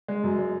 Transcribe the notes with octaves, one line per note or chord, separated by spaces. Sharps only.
G#3
F#2
G#3